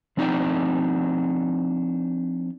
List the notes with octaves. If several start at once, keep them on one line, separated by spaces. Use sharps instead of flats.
F3 C4 D4 D#4 D5 G5